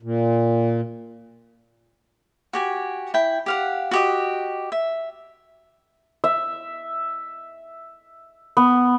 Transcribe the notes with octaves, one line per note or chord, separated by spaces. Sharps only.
A#2
F#4 G4 G#5
E4 G5
G4 F5 F#5
F#4 G4 D#5
E5
E5
B3